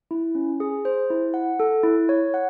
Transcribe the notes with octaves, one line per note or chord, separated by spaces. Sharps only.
E4
C#4
G#4
C5
E4
F#5
A4
E4
C#5
F#5